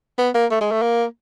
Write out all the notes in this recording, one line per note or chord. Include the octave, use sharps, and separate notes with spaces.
B3
A#3
A3
G#3
A3
A#3